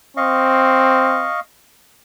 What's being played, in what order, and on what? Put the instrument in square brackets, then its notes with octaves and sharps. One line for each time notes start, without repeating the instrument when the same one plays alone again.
[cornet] C4 [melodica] D#5 F5 C#6